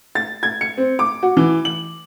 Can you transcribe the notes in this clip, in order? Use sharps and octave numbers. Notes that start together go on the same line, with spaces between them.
A6
G#6
C#7
C4
D6
F#4
E3
F#7